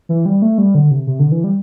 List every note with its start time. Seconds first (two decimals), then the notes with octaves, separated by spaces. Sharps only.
0.09 E3
0.26 G3
0.42 A3
0.58 G3
0.75 D3
0.91 C3
1.07 C3
1.19 D3
1.32 E3
1.44 G3